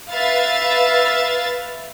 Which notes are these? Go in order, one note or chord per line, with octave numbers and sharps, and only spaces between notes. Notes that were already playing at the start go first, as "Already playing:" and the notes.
B4 E5 F5 A6